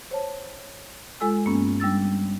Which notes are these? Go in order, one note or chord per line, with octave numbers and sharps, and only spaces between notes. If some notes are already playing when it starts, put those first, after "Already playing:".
C5 C#5 A5
G#3 F4 A4 G#5 E6
G2 A#3 B3 C#4
G3 D4 E6 A6